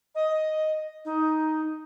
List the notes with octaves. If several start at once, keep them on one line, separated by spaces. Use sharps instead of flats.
D#5
D#4